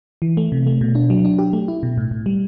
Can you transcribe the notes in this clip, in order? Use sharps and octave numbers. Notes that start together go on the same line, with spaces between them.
E3
A3
C3
A3
B2
D4
F#3
D4
G4
A3
E4
B2
A2
A2
G3